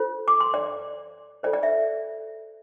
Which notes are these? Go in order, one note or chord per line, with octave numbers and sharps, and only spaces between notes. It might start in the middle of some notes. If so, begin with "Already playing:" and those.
Already playing: F4 A4 C5
D6
C6
D5
F4 A4 C5 D5
D5
E5